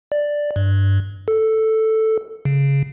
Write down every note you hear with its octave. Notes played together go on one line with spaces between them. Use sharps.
D5
G2
A4
C#3